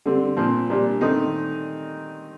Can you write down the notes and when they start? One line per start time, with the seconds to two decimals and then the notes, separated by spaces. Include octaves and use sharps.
0.06 D3 G3 C4
0.37 A#2 F3 C4
0.70 A#2 G3 D4
1.01 D#3 A3 C4 D#4